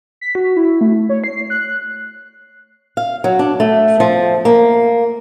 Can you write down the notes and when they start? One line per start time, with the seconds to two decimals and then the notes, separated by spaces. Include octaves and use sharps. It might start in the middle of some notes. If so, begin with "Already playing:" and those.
0.21 B6
0.35 F#4
0.57 E4
0.81 A3
1.09 C#5
1.24 C7
1.50 F#6
2.97 F5
3.24 F#3
3.39 D4
3.60 A3
4.00 F3
4.45 A#3